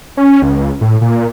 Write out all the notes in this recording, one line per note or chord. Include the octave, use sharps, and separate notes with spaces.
C#4
C#2
A2
A#2